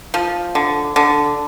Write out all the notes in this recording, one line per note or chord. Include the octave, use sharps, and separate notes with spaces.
F3
D3
D3